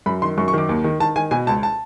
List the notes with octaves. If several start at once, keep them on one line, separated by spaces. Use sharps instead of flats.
F#2 B5
D#3 C6
F#2 C#6
C#6
D#3 D6
D#2
D#3
D#3 A5
D#3 G#5
B2 G#5
C#2 A5
A5